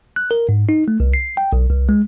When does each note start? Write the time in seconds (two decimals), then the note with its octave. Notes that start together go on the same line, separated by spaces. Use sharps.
0.16 F#6
0.31 A#4
0.49 G#2
0.69 D#4
0.88 A3
1.00 C2
1.14 C7
1.37 G5
1.53 B1
1.70 C2
1.89 G#3